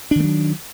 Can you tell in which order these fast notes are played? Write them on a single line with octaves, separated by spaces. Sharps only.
D4 D#3 A3 F#3